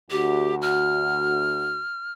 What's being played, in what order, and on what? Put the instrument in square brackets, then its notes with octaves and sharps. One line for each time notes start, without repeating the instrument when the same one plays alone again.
[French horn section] D2 F#4 [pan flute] G4
[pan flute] F6